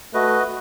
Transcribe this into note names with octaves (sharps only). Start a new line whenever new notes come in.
A3 F#4 B4 D#5